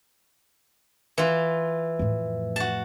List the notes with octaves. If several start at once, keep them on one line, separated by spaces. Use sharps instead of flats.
E3 F4
F2 A2
F#4 A5